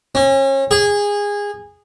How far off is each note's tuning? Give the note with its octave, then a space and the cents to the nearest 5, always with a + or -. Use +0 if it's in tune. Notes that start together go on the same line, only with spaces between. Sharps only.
C#4 -35
G#4 -20